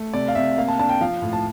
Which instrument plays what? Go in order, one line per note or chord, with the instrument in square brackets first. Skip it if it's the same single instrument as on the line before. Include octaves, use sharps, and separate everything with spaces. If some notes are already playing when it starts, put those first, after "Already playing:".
Already playing: [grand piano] A3
C3 D5
F5
C3 E5
A#3 F5
A5
D4 A5
G5
F3 F5
A2
A5